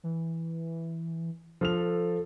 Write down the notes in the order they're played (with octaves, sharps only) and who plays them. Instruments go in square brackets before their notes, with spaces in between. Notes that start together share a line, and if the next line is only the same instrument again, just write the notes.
[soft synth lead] E3
[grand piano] F3 F6 F7 [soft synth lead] A4